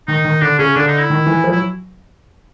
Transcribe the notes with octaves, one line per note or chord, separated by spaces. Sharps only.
D#3 D#4
D#3
D3 D4
C#3 C#4
D3 D4
D#4
E4
D#3
E3
F3
F#3 E4